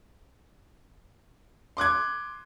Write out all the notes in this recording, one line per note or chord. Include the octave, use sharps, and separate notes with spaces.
C6 D6 F#6 G#6